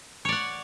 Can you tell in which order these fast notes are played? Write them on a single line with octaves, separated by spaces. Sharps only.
C#5 D5 F#5